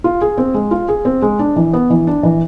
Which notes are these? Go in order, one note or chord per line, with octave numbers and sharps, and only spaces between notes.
F4
G#4
C4
G#3
F4
G#4
C4
G#3
D4
E3
B3
E3
D4
E3